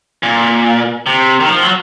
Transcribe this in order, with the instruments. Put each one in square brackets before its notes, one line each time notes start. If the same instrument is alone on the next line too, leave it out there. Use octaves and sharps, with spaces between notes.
[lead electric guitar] A#2
C3
D#3
F3
F#3